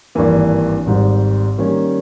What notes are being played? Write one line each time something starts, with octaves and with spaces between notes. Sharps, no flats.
G#1 G2 E3 A#3
G#1 G#2 G3
D#3 G3 A#3 C#4